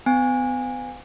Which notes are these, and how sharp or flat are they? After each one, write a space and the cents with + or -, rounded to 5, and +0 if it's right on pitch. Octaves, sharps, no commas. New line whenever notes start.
B3 +40 G#5 -20